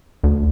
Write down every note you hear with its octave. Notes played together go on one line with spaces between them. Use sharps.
D2